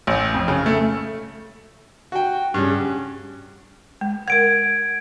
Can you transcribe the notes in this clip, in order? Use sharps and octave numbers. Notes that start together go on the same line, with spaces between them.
A1
F2
C#3
A3
F#4 G5
G2 C#3
G#3
A#4 F#5 G#6 D7